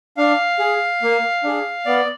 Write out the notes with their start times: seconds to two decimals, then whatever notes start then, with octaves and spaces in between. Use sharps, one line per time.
0.17 D4 F5
0.59 G#4
1.02 A#3
1.44 D4 G#4
1.86 B3 D5